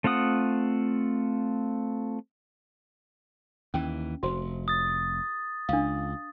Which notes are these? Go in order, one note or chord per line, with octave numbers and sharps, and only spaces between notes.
A3 C4 F4 F#5 D#6
D#2 E3 C#4
F1 F#4 C5
D#6 A6
C#2 D4 F5